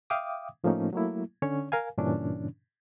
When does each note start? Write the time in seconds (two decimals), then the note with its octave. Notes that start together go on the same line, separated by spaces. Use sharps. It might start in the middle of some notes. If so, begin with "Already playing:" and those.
0.10 E5 F5 G5 D6 D#6
0.64 A2 F3 A3 A#3 C#4 D#4
0.93 F#3 A3 A#3 E4
1.42 D3 C#4 C#5
1.72 A#4 F5 G#5
1.98 G2 A#2 C#3 E3 C#4 D4